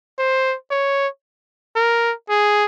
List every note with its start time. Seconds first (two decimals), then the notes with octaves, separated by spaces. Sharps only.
0.19 C5
0.71 C#5
1.76 A#4
2.30 G#4